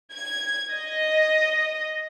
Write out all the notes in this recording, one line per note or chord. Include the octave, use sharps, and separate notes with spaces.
G#6
D#5